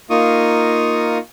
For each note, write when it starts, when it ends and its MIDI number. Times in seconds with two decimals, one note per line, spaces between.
0.10 1.18 58
0.10 1.18 63
0.10 1.18 65
0.10 1.18 85
0.10 1.18 87